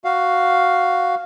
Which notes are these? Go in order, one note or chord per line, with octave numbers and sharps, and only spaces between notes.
F#4 F5